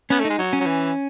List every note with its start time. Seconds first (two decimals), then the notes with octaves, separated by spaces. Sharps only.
0.10 B3 C#4
0.20 A3
0.25 G#3 D#4
0.38 F#3
0.53 C#4
0.61 F#3
0.66 E3